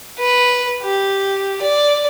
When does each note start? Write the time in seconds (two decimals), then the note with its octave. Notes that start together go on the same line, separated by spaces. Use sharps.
0.19 B4
0.83 G4
1.62 D5